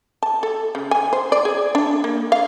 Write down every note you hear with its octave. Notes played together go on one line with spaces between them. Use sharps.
A5
A4
C#3
G#5
C5
D5
G#4
D4
A#3
F5